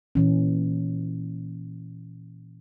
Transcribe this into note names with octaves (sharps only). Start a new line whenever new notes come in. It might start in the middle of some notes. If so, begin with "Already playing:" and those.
A#2 E3 C#4